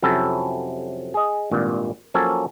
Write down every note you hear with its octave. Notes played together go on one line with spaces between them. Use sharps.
F2 C3 F#3 C#4 E4 A4
G#4 D#5
G#1 G2 A#2
F3 F#3 A#3 C#4 A4 C#5